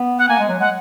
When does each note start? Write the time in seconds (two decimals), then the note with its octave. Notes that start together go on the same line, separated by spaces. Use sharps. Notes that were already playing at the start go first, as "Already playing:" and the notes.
Already playing: B3
0.18 F#5
0.29 A#3 G#5
0.39 G#3
0.49 F#3
0.59 G#3 F#5